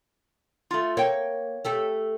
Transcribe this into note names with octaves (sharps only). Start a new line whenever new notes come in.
A3 F4
A#3 C#5 G5
A3 G4 A4